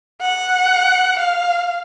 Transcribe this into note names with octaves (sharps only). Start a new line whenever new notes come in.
F#5
F5